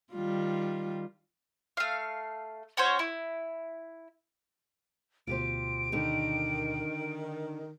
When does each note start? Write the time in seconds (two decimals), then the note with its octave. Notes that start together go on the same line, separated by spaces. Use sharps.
0.13 D#3 G3 F4
1.77 A3 F5
2.77 C#4 F#4 C5 C#5
2.99 E4
5.27 D2 B2 F4 G4 C5 D7
5.92 D3 D#3 D#4 G4